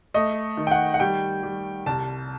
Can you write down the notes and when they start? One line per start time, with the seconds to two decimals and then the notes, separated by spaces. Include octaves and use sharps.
0.14 A3 D#5
0.57 D#3
0.67 G5
0.71 F#5
0.94 F#5
1.00 G3 G5
1.43 G3
1.86 C2 A5